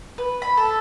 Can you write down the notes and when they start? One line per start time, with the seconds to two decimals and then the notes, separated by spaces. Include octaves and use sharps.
0.18 B4
0.42 B5
0.57 A4